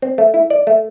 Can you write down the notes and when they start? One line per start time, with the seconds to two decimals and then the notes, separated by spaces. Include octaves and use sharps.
0.02 C4
0.18 A3
0.34 E4
0.50 D5
0.67 A3